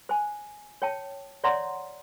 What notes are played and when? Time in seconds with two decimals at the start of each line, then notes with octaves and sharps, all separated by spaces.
0.09 C5 G#5
0.82 C#5 G5 A5
1.44 C#5 D5 E5 F#5 A#5 C6